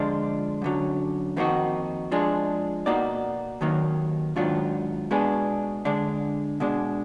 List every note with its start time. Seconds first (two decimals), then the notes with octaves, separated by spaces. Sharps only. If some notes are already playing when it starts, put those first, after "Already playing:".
Already playing: D3 F3 G#3 D4 F4
0.62 F#2 D3 F#3
1.37 F2 D#3 A#3 D#4 F#4
2.12 F3 G#3 D4 G#4
2.86 B2 A#3 D#4 F#4 D5
3.61 D#2 D#3 F#3 A#3
4.36 G#2 D#3 F#3 D4 F4
5.11 B2 G#3 B3 D4 G#4
5.85 D3 G#3 D4
6.60 B2 G#3 D4